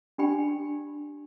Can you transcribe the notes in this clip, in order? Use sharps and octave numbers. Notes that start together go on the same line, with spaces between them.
D4 G4 D5 G5 B5